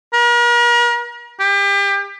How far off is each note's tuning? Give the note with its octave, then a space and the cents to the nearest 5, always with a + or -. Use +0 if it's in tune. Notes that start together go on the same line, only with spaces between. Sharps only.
A#4 +40
G4 +30